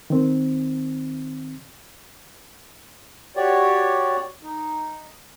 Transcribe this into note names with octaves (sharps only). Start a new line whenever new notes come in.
D#3 C4
F#4 G4 C#5 D5
D#4